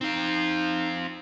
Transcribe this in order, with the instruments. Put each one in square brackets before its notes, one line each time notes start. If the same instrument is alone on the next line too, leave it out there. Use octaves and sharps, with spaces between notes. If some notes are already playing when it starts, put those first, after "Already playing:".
[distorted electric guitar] C4 F4 [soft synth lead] D#4